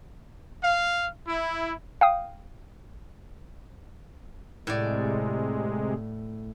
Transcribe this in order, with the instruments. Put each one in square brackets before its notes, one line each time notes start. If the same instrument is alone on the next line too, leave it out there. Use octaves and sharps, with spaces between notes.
[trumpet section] F5
E4
[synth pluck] F5 G5 D#6
[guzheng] A2 D5 [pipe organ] C3 G#3